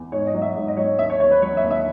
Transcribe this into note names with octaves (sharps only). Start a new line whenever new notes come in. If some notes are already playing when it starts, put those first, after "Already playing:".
Already playing: E2
G#2 C#5
D#5
F#3
E5
G#2
D#5
F#3 C#5
D#2 E5
C#5
D#2 C#5
B4
F#3 C#5
E5
D#2
E5